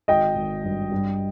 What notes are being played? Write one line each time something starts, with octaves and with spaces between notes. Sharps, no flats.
G#1 D#5 G5
G#1
G2
G2